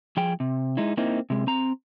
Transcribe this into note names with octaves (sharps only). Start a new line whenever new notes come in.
F3 G#4 G5
C3
G#3 D#4 E4
A#3 C4 D#4 E4
C3 G#3
C4 A#5